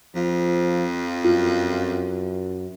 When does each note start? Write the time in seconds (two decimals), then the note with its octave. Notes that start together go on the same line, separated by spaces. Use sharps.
0.15 F2 F3
1.25 F#2 F4